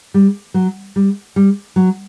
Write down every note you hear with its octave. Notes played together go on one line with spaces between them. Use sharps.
G3
F#3
G3
G3
F#3